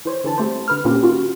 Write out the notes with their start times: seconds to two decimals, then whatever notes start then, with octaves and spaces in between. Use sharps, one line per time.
0.05 E3 C5 C#5
0.24 D3 E3 A5
0.38 G3 A3 C4 C5
0.68 D3 B4 F6
0.85 A#2 A#3 C4 C#4 G4
1.02 D#3 F4 F#4